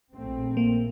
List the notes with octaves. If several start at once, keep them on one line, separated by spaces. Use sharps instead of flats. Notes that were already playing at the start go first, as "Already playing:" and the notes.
A#1 A3 C4
A#3